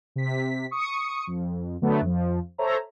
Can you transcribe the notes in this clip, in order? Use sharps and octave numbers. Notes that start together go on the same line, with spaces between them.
C3 B6
C#6 D#6 C#7
F2
D3 F#3 A3 B3
F2 F3
A4 C5 C#5 E5 A#5